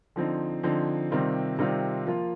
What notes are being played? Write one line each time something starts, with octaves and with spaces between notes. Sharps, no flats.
D3 F3 C4 D#4
D3 F3 C4 D#4
C3 D#3 G3 C4 F4
C3 D#3 G3 C4 F4
F3 A#3 F4